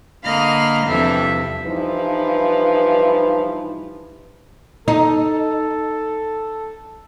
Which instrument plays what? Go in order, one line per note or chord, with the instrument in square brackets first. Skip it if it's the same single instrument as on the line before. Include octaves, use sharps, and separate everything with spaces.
[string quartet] D3 A#3 D#5 F5 B5 F6
E2 G2 C3 F3 A4 E5
[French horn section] G2 E3 F3 D#4 B4
[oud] D#4 [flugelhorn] A4